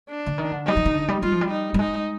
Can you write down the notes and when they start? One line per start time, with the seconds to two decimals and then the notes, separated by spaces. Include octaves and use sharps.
0.09 D4
0.26 D3
0.38 D#3
0.52 D3
0.66 G3 D#4
0.77 F3
0.86 D#3
0.94 D3
1.08 G3
1.22 G3 F4
1.32 F3
1.41 G3
1.51 D#4
1.74 G3
1.79 G#3 D#4